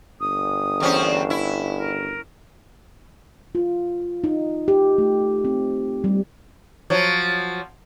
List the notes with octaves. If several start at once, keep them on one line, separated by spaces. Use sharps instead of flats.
G1 D#6
E2 C4 C#4
E4 E5
A#4
F4
D#4
G4
A3
C4
G3
F3 F#3